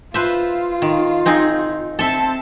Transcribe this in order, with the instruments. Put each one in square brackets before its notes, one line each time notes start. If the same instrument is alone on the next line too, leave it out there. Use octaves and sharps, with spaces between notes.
[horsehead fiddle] F4 [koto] B4 C5 E5
[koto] D#3
C4 D#4 G#4
[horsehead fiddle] C4 A5 [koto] A4 E5